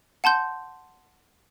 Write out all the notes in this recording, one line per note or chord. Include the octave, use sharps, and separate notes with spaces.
F#5 A5 C6 G6